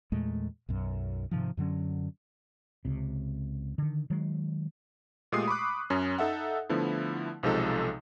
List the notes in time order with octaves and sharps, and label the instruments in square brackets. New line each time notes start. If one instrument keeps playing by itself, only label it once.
[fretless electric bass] E2 A#2 G#3 A3
B1 F#2
G#2 C3 D#3 F3
F#2 D3 F#3 C#4
C#2 C3
D3 D#3
D#3 F#3 G#3
[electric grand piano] A#2 G#3 A3 G4 D#6 C7
B5 C#6 D6 F#6
F#2 C#4
D#4 A4 E5 F#5
D3 F3 A3 B3 E4
B1 C3 F3 G#3 D#4 A4